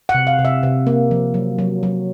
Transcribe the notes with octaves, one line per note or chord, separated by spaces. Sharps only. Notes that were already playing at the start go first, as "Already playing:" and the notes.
F#5
C3
F5
C3
E5
C3
A#3
F3
F#3
F#3
F#3